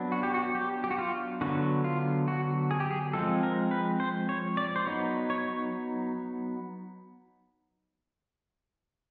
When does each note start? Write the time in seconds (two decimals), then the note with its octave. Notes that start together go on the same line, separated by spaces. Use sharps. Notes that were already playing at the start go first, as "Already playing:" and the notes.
Already playing: F#3 B3 D4
0.12 F#4
0.23 G4
0.34 F#4
0.55 G4
0.84 G4
0.91 F#4
0.98 F4
1.41 D3 F#3 B3 F#4
1.84 F4
2.28 F#4
2.71 G#4
2.80 G4
2.91 G#4
3.13 F3 G#3 C4 A4
3.43 A#4
3.71 B4
4.00 C5
4.29 C#5
4.57 D5
4.76 C5
4.86 F#3 B3 D#4 C#5
5.30 C#5